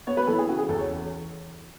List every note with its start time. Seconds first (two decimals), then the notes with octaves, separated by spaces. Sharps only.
0.07 B3 C#5
0.17 B4
0.27 E3 A4
0.38 G#4
0.48 C#3 F#4
0.58 G#4
0.68 E2 A4
0.79 C#5